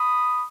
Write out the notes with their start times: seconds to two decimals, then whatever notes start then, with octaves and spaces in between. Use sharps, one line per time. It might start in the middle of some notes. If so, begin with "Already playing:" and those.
Already playing: B5 D#6